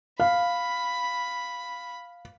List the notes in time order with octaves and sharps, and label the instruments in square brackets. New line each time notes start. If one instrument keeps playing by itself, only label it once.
[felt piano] F5 [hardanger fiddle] B5